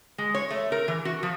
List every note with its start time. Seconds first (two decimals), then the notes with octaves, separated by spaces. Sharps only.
0.18 G#3
0.35 C#5
0.50 A3
0.72 A#4
0.88 E3
1.05 F#4
1.23 F3